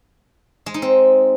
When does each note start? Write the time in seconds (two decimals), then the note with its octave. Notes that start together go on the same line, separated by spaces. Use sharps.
0.66 G#3
0.74 D#4
0.82 C4